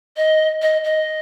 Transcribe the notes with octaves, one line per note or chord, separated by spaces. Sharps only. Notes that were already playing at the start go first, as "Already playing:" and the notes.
D#5
D#5
D#5